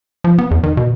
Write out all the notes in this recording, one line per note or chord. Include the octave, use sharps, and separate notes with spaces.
F3
B3
E2
D#3
B2